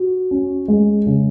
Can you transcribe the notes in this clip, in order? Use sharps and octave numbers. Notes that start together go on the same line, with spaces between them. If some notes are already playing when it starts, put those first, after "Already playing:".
Already playing: F#4
C#4
G#3
C#3